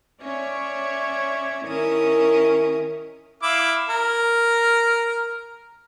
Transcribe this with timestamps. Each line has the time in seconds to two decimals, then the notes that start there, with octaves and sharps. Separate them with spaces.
0.22 C#4 C#5 D5 E5
1.64 D#3 C#4 E4 A#4 E5 D#6
3.43 E4 F5 D6
3.89 A#4